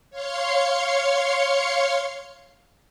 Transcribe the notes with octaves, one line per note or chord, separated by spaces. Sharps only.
C#5 F5 C6 C#7